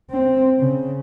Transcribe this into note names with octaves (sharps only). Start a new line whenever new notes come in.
C4
C#3